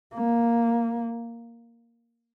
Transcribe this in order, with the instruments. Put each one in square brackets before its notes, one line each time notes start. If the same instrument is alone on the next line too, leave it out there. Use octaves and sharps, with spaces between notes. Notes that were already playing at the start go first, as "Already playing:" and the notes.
[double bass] A#3